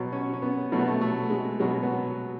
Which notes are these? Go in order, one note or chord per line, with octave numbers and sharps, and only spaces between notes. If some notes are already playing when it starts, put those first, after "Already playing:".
Already playing: B2 F#3
C#4
C#4
B3
B2 F#3 A3
B3
A3
A3
G#3
B2 F#3 G#3
B3